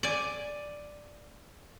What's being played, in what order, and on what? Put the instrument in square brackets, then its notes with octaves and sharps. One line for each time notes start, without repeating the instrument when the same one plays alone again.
[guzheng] D5 G#5